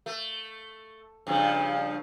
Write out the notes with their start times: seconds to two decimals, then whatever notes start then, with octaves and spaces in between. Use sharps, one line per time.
0.06 A3
1.27 G2 C#3 F3